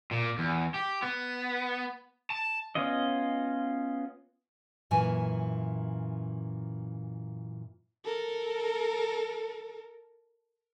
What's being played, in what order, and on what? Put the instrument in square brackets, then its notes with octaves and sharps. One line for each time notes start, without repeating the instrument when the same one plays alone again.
[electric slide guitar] A#2
E2
G4
B3
A5
[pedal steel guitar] B3 C#4 F4 D#5
[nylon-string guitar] F#2 A#2 E3 G#5
[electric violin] A4 A#4